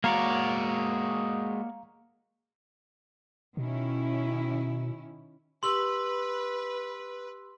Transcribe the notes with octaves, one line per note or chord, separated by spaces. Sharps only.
G#3 A#3 F#4 C#5 D5 F5 A#5
B2 D#3 C#4 E4
G4 B4 C6 E6 F#7